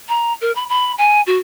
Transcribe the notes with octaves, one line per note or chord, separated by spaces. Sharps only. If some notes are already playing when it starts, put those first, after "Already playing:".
A#5
A#4
B5
B5
G#5
F#4